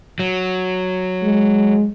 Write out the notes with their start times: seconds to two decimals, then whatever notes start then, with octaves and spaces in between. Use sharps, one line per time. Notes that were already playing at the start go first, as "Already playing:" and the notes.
0.19 F#3
1.23 G#3